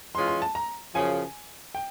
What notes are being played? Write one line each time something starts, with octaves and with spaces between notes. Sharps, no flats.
E3 G#3 C#4 F4 C6
C6
A5
A#5
F#2 C#3 F3 G#5
G5